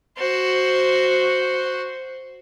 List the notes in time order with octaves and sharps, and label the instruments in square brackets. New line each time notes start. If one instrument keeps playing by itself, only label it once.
[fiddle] F#4 C5